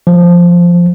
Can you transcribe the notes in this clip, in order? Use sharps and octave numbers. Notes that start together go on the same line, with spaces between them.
F3